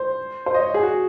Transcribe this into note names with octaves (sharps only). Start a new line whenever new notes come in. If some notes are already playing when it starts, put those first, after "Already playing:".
Already playing: C5
C5
D#5
C#5
G#4
F#4